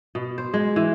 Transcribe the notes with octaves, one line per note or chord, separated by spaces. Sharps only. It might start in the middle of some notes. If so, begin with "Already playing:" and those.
B2
C5
G#3
E3